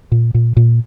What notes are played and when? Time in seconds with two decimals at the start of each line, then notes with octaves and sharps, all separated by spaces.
0.12 A#2
0.34 A#2
0.57 A#2